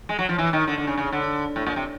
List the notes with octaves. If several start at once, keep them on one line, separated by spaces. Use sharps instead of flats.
G#3
F#3
F3
E3
D#3
D3
D3
C#3
C#3
D3
A2
A#2
C3